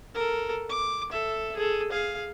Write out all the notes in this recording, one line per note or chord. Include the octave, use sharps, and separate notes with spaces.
A4 A#4
D6
A4 E5
G#4 A4
G#4 F5